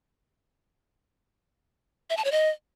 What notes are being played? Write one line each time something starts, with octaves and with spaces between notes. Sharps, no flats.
E5
A5
C#5
D#5